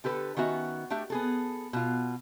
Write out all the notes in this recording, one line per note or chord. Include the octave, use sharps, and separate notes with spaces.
D3 G4 A4 B4
D#3 B3 C#4 F#4 E5
A3 D4 G4 E5
B3 G#4 A4
B2 F4